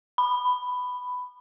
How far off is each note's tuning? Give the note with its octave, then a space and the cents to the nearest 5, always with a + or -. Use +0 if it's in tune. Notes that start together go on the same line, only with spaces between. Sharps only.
B5 +10